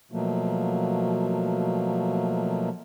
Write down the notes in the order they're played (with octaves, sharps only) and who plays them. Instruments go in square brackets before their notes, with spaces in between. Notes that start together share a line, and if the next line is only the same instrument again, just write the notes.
[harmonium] B2 F3 F#3 A3 A#3